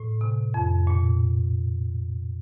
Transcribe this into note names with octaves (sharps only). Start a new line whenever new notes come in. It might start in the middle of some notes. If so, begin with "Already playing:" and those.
Already playing: A2
C3
F2
A#2